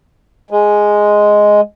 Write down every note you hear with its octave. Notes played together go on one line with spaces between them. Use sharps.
G#3